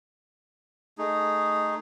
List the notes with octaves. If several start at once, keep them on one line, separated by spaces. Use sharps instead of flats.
A3 D#4 G#4